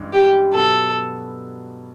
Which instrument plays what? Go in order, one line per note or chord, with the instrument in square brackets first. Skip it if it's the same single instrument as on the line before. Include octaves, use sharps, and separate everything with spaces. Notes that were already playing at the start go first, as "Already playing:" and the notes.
Already playing: [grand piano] G2 E3 G#3 C#4
[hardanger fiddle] G4
[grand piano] B2 F#3 B3 [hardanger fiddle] A4